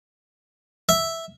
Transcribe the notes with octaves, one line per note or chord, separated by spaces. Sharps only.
E5